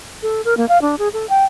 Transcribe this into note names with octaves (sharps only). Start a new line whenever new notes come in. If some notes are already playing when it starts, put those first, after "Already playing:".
A4
A#4
A#3
F5
D4
G#4
A4
G5